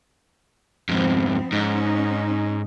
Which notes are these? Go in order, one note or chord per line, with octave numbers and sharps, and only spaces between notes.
F2 G#2 F3 B3 C4
G#2 C#4 D#4